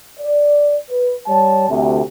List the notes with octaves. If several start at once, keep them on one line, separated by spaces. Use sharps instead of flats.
D5
B4
G3 C#5 A5
D2 C3